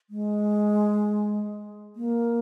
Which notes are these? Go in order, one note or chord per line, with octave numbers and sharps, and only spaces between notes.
G#3
A#3